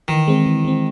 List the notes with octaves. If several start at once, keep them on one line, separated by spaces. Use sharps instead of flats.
D#3 E3
G#3 C4
E3
G#3 C4